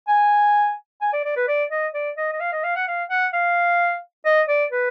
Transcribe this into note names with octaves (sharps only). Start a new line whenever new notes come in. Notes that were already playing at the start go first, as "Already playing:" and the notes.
G#5
G#5
D5
D5
B4
D5
D#5
D5
D#5
D#5
F5
D#5
F5
F#5
F5
F#5
F5
D#5
D5
B4